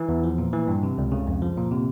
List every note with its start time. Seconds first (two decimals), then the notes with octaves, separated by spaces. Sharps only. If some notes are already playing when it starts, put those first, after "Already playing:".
Already playing: E3
0.09 E2
0.24 F3
0.38 A#2
0.53 E3
0.68 G2
0.83 C3
0.98 C#2
1.12 C#3
1.27 F2
1.42 F3
1.57 A#2
1.71 C3